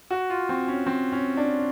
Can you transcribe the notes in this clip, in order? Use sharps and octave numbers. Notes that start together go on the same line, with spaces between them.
F#4
F4
C4
C#4
C4
C#4
D4